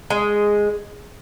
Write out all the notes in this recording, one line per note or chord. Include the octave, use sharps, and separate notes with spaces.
G#3